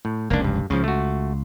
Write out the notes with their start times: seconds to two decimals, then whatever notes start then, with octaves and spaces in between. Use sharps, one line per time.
0.05 A2
0.30 F1 C#2 A#3 D4
0.44 G2
0.70 C#2 C#3 F3
0.84 A3 F#4